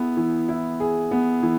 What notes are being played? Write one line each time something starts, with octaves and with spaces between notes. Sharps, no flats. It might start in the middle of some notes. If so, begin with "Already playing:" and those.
Already playing: B3 E4 G#4
E3
E4
G#4
B3
E3